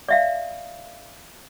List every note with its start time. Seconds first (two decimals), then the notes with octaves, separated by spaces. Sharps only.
0.08 D5 E5 F5